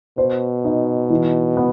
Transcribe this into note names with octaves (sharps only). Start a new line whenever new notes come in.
B2 C5
D#4
E3
B3